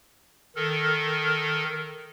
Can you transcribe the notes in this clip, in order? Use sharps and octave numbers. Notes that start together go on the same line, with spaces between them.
D#3 A4 A#4